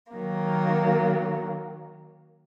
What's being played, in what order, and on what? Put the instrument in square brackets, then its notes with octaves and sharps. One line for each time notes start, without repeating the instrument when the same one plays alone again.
[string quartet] D#3 F#3 A#3